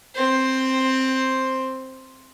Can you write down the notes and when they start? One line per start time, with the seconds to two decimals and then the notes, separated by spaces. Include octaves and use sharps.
0.15 C4 C5